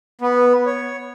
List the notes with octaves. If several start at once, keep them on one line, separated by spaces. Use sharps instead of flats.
B3
C#5